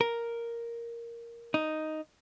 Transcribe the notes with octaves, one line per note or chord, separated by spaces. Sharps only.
A#4
D#4